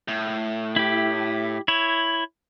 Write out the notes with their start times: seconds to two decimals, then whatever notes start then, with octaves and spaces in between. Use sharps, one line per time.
0.08 A2
0.76 E4 G4
1.68 E4 C#5